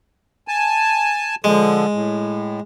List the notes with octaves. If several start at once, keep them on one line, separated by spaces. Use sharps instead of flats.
G#5 A5
D3 F3 G#3
A2